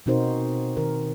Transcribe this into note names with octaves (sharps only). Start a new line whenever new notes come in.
B2 C4 D#4 F#4 A#4 C5
D#3 A#4